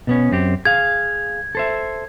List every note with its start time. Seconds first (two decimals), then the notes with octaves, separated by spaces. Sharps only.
0.07 B2 B3 C#4
0.32 F#2 C4 G4
0.65 G#4 F5 G#6
1.55 A4 C5 E5